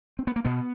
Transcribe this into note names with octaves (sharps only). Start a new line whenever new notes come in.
C4
B3
A#3
B2 B3